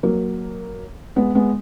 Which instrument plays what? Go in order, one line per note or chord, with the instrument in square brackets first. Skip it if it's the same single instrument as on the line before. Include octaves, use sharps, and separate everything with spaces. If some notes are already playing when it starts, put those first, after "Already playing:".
[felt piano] F#3 A#3
G#3 B3
G#3 B3